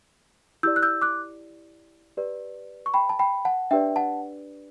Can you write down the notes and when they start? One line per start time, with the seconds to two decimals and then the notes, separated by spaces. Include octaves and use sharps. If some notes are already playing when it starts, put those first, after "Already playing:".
0.63 E4 G4 D5 E6 G6
0.76 F#6
0.82 E6 G6
1.02 D6 F#6
2.17 G4 B4 D5
2.86 C#6
2.94 G5 B5
3.09 A5
3.19 G5 B5
3.45 F#5 A5
3.71 D4 G4 B4 D5 E5 G5
3.96 F#5 A5